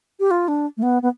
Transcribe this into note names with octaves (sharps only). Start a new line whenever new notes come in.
G4
F4
D4
A3
B3
B3